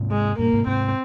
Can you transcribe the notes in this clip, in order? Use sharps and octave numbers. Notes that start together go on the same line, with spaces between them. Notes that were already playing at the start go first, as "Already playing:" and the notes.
Already playing: G#2 C3
G#3
G2 A#2 A#3
G#2 C3
G#2 C3 C4